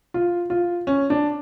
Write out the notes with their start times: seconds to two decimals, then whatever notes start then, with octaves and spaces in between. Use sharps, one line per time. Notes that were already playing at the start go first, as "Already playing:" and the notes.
0.14 F4
0.50 F4
0.87 C#4
1.10 D4